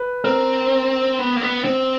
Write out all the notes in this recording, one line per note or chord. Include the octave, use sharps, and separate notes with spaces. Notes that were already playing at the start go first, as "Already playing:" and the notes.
Already playing: B4
C4 A#4
B3
A#3
B3
C4